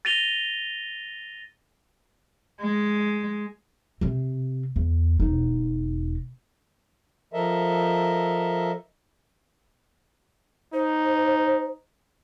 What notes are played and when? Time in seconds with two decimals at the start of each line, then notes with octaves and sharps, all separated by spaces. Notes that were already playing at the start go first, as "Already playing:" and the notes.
0.05 A6 A#6 D#7 F7 G7
2.61 G#3
4.01 C3 C4
4.76 E2
5.20 E1 D#4
7.33 F3 A4 A#4 D#5 E5
10.73 D#4 C5